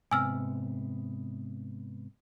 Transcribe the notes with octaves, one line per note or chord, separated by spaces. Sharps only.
G#2 C3 B3 G#5 E6 F6